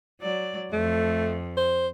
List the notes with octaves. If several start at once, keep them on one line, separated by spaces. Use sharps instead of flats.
F#3 D5
F2 A3
C5